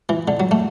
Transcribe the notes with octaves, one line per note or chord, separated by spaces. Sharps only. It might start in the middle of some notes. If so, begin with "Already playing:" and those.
E3
D3
F#3
A3